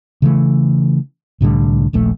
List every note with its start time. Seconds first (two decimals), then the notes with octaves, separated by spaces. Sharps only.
0.22 C#3 E3 A3
1.41 C2 A2 D3 G3
1.93 D#1 A#1 A3